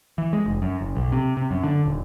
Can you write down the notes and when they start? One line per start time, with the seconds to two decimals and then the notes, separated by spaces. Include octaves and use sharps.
0.18 E3
0.33 G#3
0.46 F1
0.62 F#2
0.81 F#1
0.96 B1
1.12 C3
1.37 C3
1.51 F#2
1.63 D3
1.86 D#1